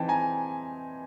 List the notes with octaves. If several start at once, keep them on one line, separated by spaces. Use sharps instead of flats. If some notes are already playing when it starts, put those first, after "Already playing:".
Already playing: E3 C4 D#4 G5 A5
G#5 A#5